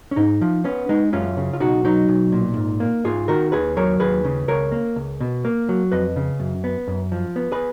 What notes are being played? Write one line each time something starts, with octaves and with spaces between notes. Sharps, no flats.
C#4
G#2 D#4
F3
B3 C#4
G#3 D#4
F#2 C#4 F4
C#3
F4
B1 D#4 F#4
F#3 D#4
B1
A#2
G#2
A#3
G#2 F4 G#4
D#3 F#4 A#4
D#2 G#4 B4
F#3 A#4 C#5
D#2 G#4 B4
C#3
C#2 A#4 C#5
A#3
C#2
B2
A#3
F#3
F2 B4 D#5
C#3
F#2
B3
F#2
F3
B3
G#4 B4